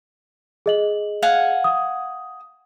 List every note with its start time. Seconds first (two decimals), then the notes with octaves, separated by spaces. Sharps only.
0.66 G#4 D#5 F#7
1.22 F5 F#5 G#5
1.64 D#6